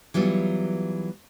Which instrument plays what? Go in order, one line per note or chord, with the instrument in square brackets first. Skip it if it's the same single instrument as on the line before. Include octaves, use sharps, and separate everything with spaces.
[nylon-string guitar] E3 F#3 G3 B3 F4